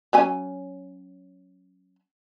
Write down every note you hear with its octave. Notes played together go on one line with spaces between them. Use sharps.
F#3 C#4 G#5